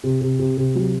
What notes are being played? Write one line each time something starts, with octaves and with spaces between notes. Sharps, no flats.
C3
C3
C3
C3
F#3